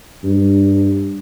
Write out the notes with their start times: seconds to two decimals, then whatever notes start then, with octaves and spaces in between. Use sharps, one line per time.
0.24 G2